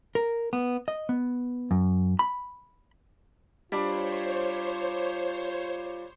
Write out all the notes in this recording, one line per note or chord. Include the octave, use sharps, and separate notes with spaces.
A#4
B3
D#5
B3
F#2
B5
G3 D4 F4 C5 C#5